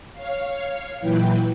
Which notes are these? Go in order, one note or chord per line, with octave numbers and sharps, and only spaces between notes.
C#5 F5
A#2 E3 F#3 E4 B4 G5